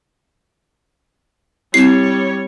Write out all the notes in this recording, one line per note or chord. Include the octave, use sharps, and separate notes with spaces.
G3 C4 E4 G4 C#5 C7